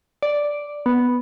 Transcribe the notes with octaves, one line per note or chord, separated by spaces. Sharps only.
D5
B3